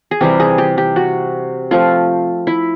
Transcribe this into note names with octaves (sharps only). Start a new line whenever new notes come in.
G#4
C3 E3 G3 G4
G#4
G4
G4
F#4
F3 A3 C4 F4
E4